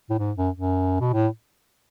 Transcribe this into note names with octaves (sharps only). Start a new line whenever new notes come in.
A2
G#2
F#2
F#2
B2
A2